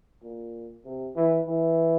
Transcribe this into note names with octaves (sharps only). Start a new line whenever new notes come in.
A#2
C3
E3
E3